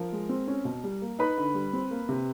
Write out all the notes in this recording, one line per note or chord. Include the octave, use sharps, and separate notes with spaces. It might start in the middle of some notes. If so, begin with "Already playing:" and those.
Already playing: F3 A#4
G#3
C4
C#4
B2
G3
A#3
D#4 B4 B5
D3
G3
C4
A#3
C3